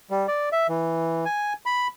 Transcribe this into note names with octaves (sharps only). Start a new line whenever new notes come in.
G3
D5
E5
E3
G#5
B5